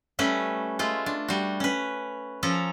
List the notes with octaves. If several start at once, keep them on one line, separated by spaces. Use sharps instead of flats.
G3 A3 C#4 B4
G#3 A3 F4
D4
G3 F#4
C#4 B4
F3 C#4 A4 A#5